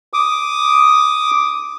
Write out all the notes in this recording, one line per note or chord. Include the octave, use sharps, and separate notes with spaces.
D6 D#6